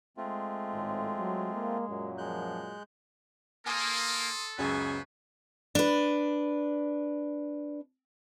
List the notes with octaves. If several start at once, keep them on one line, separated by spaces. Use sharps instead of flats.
G#3 A3 C4 F4
G#1 A2
F#3
A#3
F#2 A#2 F#3
F3 G#3 F#6 G6
A#3 A4 G#5 C6 D#6
C#2 F#2 C#3 B3 B4 C5 G#5 C#6
D4 B4